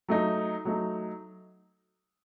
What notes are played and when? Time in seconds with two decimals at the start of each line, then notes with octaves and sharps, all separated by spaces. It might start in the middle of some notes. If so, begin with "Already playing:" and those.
0.08 F#3 A3 D#4
0.65 F#3 A3 D#4